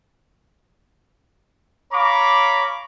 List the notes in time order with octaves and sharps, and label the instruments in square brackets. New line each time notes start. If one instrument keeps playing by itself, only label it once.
[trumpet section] C#5 F5 A#5 B5 C#6 D6